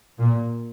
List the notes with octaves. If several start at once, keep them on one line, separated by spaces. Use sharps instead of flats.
A#2